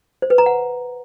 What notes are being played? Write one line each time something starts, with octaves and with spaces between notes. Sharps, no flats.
C5
B4
A#5
F#5